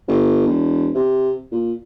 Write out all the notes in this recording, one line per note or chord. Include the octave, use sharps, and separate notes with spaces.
G1
E1
C3
A#2